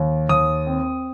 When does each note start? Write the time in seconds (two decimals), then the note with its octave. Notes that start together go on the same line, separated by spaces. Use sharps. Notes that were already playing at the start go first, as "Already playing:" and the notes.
Already playing: D#2
0.29 D#2 D#6
0.67 C4